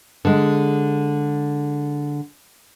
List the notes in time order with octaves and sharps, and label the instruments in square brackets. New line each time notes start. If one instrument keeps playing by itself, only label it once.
[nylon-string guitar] D3 G#3